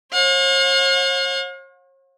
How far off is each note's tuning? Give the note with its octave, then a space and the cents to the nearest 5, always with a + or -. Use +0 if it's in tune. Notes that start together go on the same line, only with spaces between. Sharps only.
C#5 -45 F5 +45